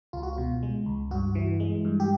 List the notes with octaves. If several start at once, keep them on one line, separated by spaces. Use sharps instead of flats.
C#2 F4
F#4
B2 F4
G#3
C#2
G2 F#4
E3
G#3
G2
G4